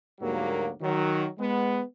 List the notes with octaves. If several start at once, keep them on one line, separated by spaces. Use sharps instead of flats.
D2 G#2 F#3 G3 A#3
D#3 F#3
G#3 B3